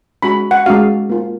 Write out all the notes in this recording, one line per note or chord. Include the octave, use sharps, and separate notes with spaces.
G#3 C#4 F#4 B5
F#5
G#3 C#4 F#4 F5
A#3 F4